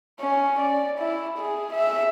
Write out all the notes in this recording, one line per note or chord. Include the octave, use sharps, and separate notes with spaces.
C#4
D5
E4
G#4
E5